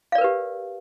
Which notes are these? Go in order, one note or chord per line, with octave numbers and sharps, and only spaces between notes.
G4 A#4 B4 D5 F5